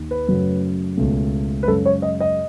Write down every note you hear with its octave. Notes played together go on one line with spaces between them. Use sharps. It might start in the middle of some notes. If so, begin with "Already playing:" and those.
Already playing: D#2 D#3
B4
F#2 C#3 F#3 A3 C#4
C#2 B2 A3 C#4
B4
F#2 C#3 G#3 A4
C#5
D#5
D#5